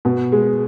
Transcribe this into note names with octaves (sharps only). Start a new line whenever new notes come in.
B2
G#3